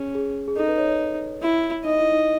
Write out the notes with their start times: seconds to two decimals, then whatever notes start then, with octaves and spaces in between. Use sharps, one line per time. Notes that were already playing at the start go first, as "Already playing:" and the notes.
Already playing: C#4 G#4
0.15 G#4
0.48 G#4
0.56 D#4 A4
0.68 B4
0.78 C#5
0.88 C#5
1.42 E4
1.85 D#4 D#5
1.99 E4
2.12 D#4